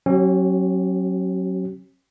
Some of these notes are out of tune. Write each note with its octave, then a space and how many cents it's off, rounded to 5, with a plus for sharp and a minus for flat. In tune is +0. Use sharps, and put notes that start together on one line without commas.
F#3 +0 C#4 -35 F#4 +45